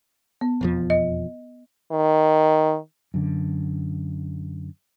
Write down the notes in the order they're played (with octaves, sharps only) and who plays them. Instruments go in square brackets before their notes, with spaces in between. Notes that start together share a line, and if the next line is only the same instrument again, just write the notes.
[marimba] B3
[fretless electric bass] E1 F2 F3
[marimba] D#5
[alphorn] D#3
[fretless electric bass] F#2 D3